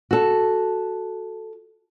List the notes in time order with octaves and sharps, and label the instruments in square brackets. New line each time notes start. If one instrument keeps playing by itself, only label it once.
[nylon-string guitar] F#4 A4